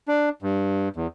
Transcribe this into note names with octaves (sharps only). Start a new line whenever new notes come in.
D4
G2
E2